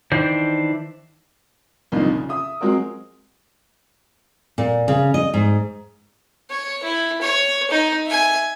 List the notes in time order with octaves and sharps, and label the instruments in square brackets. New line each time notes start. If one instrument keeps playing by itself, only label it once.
[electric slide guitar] D#3 E3 D4 C5
[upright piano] C2 F2 A#2 D3 D#4 F4
C#3
E5 D#6
F#3 G#3 C4 F#4 A#4
[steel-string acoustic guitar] A#2
C#3
D#5
G#2
[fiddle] C#5
E4
C#5
D#4
E5 G#5